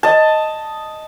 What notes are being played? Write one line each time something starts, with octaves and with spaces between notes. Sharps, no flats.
D#5 A5